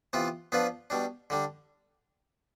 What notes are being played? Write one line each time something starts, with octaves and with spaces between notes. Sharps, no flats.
C3 E3 B3 F4
F3 B3 D4 F4 B4
B2 G3 D4
D3 G3 D4